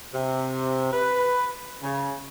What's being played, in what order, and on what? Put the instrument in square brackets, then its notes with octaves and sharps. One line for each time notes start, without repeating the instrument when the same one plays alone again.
[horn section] C3
B4
C#3